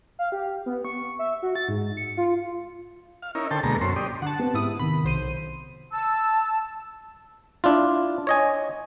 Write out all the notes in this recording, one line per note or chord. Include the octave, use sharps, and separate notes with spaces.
F5
G4
B3
C#6
E5
F#4
A6
G#2
C#7
F4
F5
C#4 D#4 E4 A#4
D3 A4 C5 G5 A5
D2 B2 G#3 A#3 A4 A#5
F#2 C#4 C5 C6
G4 D5 D#6
D3 F#5 A5
B3 C4 G4
G#2 E4 D#6
C3 D#3 B5
B1 C5 D#7
A5 E6
D4 E4 F4
C#5 D#5 G#5